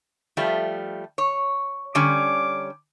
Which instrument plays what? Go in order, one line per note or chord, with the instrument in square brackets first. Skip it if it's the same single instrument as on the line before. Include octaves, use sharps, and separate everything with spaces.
[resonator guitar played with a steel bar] F3 G3 A3
C#5
[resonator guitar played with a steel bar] D3 G3 C#4 [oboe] D6